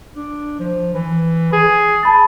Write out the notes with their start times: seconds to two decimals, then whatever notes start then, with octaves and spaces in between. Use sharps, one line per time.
0.15 D4
0.60 F3
0.94 E3
1.52 G#4
2.03 A5 B5 A6